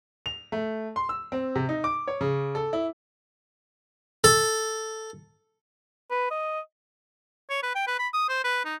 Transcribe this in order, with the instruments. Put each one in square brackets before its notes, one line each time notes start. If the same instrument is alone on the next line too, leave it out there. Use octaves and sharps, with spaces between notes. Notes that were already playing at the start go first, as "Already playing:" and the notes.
[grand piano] F7
A3
C6
E6
C4
C3
D#4
D6
C#5
C#3
A4
E4
[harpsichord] A4
[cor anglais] B4
D#5
[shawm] C#5
B4
G5
B4
B5
D#6
C5
B4
D#4